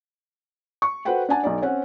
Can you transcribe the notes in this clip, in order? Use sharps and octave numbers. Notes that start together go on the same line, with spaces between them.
C#6
F#4 A4 B4 C5 F#5 G5
D4 F#5 G#5 A5
B1 D#4 D5
C4 C#4 F#5